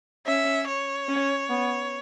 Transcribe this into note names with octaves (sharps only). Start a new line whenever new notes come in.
C#4 E5
C#5
C#4
B3